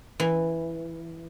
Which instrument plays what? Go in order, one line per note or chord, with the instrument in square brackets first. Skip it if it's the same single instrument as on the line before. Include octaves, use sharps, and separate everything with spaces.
[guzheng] E3